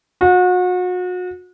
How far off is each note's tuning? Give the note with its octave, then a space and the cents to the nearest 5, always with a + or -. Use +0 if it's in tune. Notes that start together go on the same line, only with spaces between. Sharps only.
F#4 -35